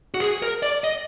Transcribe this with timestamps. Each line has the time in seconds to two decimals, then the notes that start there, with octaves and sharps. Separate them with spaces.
0.14 F#4
0.20 G#4
0.42 A#4
0.63 D5
0.84 D#5